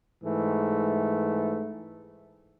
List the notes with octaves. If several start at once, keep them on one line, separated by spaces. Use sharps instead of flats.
G#2 E3 A3